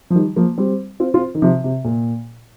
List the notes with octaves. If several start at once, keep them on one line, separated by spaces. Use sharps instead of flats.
F3
D#3 G3
F3 A#3
G3 C4
C4 F4
C4 F4
D#3
C3 F3
C3
A#2